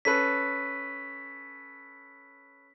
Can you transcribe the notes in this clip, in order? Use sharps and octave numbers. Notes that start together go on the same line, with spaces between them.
C#4 A4 B4 B6